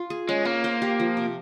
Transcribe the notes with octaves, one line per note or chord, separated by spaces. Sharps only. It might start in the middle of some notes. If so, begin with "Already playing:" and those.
Already playing: F4
G#4
G#3 C#4
A#3 C#4
C5
G4
F3
C3